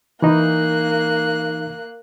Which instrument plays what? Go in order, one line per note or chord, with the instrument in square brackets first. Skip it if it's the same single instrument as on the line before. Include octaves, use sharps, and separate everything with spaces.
[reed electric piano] E3 D#4 [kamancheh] A#3 F#6